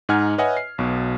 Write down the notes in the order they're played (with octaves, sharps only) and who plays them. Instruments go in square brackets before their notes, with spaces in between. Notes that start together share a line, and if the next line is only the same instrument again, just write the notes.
[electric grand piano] G#2 D#4 F#5 G#5 F6 G#6
B4 C#5 D#5 E5 F#5 G#5
C7
B1 B2